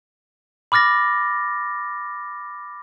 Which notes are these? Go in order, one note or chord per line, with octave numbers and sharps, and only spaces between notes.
B5 D6 F6 A6 A#6